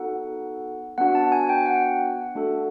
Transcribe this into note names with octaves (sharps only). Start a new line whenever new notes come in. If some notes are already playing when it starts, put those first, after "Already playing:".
Already playing: B3 D#4 F#4 A4 F#5
B3 D4 F#4 F#5
A5
G#5
G5
F#5
A3 D4 F#4 A4